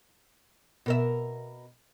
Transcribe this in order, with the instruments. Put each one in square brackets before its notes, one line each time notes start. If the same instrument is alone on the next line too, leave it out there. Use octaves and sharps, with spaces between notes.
[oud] B2 A#4 E5